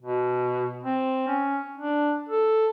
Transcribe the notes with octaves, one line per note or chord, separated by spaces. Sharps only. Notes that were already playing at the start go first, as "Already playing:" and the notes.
B2
C4
C#4
D4
A4